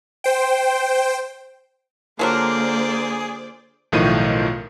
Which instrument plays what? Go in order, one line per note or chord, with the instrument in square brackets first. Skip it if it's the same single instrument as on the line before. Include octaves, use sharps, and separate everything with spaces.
[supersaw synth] C5 G5
[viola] D3 A#3 [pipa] F3 F#3 A#4 [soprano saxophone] G#4 [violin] C5 D5
[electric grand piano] B1 A2 D#3 F3 D#7